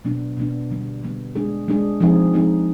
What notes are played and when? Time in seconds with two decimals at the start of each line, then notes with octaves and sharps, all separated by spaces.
0.05 B2 B3 D4
0.37 B2 B3 D4
0.71 D3 G3 B3
1.03 D3 G3 B3
1.36 G#3 D4 G#4
1.68 G#3 D4 G#4
2.00 F3 G#3 C4 D#4 G#4
2.34 F3 G#3 C4 D#4 G#4